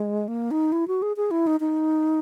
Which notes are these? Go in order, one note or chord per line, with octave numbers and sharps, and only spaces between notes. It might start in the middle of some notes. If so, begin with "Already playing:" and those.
Already playing: G#3
A#3
D#4
E4
F#4
G#4
G#4
E4
D#4
D#4